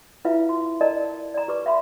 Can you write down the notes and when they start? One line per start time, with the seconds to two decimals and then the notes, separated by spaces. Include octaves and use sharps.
0.25 E4 F4 B4 E5 F5
0.49 F4 C6
0.81 A#4 D5 D#5 A5 A#5
1.34 D5 A#5
1.48 G4 B4 D6
1.66 E5 F5 B5 C6